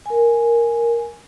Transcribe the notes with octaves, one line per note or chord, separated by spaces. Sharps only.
A#4 G#5